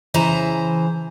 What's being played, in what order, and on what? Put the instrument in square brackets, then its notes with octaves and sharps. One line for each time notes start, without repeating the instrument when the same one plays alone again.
[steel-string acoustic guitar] C#3 E3 C5 A5 A#5